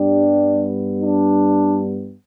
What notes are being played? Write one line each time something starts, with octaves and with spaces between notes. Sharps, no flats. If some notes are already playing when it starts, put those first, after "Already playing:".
Already playing: G2 G3 B3 D4 G4
D4